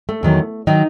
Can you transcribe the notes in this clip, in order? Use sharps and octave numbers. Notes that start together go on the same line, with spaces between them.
A3
E2 D#3 F#3
D#3 F#3 D#4